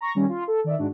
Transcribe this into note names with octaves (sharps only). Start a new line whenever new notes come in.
A#5 C#6 A#6
D#3 G3 C#4
F4
A4
D#3 D5 E5
G#2 D4 F#4